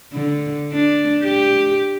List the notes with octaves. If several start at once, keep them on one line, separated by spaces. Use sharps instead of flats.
D3
D4
G4